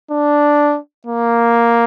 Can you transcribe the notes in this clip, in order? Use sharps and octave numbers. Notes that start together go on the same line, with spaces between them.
D4
A#3